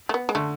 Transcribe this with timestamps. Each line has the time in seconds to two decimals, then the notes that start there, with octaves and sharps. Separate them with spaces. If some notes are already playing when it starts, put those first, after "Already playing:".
0.09 A3
0.14 B3
0.29 G#3
0.35 D3 A3